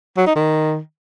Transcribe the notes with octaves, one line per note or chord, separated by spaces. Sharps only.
F#3
D#4
D#3